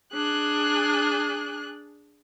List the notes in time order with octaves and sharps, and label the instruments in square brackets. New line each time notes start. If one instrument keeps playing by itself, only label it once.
[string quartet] D4 G#4 F#6